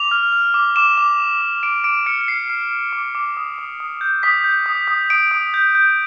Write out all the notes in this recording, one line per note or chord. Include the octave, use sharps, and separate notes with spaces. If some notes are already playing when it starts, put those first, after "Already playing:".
Already playing: D6 F7
F6
F6
D6
D6 E7
D6
D6
D6
D6 D7
D6 D7
F6 C#7
C#7
F6 C7
F6 C7
F6
D6
D6
D#6
D#6
D#6
G6
D#6 B6
G6
D#6
D#6
D#6 D7
D#6
G6
G6